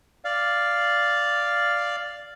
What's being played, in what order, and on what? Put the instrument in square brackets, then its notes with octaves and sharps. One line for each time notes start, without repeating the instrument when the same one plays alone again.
[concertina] D5 F5